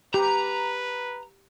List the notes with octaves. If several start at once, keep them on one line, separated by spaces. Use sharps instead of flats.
G4 B4 A#5